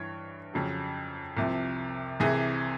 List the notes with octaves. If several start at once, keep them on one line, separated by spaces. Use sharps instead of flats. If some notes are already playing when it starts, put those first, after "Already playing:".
Already playing: G2 E3 C#5
F2 C#3 F#3
C2 C3 F3
C2 C3 E3 G#4